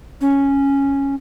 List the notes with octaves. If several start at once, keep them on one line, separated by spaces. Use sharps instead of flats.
C#4